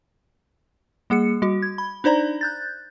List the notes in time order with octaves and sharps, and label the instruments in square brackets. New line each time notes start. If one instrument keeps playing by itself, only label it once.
[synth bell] G3 A#3 G#4 C#7
G3 F#4
G#6
B5
D4 D#4 C5 D5 A#5
F#6 G6 A6